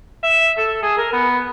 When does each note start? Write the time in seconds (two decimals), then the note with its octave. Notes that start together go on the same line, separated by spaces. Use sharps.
0.23 E5
0.58 A4
0.83 G#4
0.98 A#4
1.12 B3